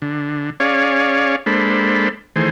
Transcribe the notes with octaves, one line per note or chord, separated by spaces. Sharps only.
D3
C#4 G#4 C#5 D5 F5
G#3 A#3 D4 A4 C5 B5
D#3 E3 A3 G#4 C5